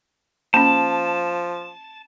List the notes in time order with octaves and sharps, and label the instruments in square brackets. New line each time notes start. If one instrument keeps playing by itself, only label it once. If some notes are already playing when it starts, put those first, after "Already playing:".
[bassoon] F3 [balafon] A#3 C#4 [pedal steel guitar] A5